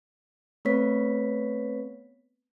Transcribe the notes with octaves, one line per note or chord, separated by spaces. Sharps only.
A3 B3 C4 B4 C#5 B6